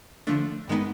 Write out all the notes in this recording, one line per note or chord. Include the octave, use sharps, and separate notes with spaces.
D3 F3 A3 D4
G2 D#3 G#3 B3 D#4